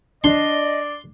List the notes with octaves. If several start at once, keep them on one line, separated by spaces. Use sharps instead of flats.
D4 D5 D#5 C6